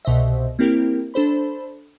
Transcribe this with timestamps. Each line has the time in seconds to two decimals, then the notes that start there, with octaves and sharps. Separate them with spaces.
0.05 C2 B2 C5 D#5 E5
0.59 A#3 C4 E4 G4 A#4
1.14 D4 A4 C5 B5